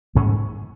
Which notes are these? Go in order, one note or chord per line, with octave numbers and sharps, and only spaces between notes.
G#2 G3 C#4